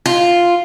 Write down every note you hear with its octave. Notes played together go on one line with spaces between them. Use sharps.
F4